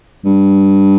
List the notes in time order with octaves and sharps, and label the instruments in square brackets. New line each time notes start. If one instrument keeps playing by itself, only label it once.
[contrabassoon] G2